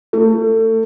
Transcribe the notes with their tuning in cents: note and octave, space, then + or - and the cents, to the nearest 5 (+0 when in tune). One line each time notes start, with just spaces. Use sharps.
A3 +30